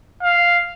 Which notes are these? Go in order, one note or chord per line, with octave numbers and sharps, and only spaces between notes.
F5